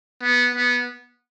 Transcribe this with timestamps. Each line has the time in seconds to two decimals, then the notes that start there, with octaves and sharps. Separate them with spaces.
0.22 B3
0.55 B3